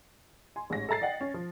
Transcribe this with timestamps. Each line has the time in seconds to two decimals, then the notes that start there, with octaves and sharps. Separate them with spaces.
0.56 G#5 C6
0.70 A1 G#2 C#5 A#6
0.89 A4 E5 A#5 A6 C7
1.02 D5 D#5 F#5 G5
1.21 C#4
1.34 F3